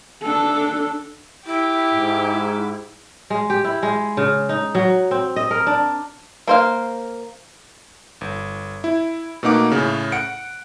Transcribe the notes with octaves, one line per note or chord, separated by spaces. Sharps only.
D4 A4
E4 G4 D6
G#2
G#3
G4
E4
G#3
C#3
D#4
F#3
C4
D#5
A#4
D4
A#3 C5 F5
G1
E4
B2 A3 A#3 D#4 F#5 D6
A2 C#3
F#5 C#7 D7